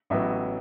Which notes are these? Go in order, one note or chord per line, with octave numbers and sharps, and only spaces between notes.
A1 A2 F#3 B3 E5